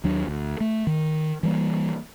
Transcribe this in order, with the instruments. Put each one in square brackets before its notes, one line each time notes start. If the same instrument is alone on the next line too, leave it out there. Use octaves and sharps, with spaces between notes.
[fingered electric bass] D#2 F#3 D4
D2
A3
D#3
E3 G3 A#3